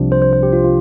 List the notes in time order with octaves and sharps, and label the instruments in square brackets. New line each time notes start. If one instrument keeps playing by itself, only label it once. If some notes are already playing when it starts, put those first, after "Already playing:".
Already playing: [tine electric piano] C2 C3 F3 D4
[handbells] C5
C5
C5
G4
F4
F4